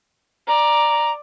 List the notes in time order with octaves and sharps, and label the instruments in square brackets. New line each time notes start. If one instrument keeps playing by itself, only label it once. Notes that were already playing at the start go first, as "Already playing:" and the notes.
[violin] D5 [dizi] A#5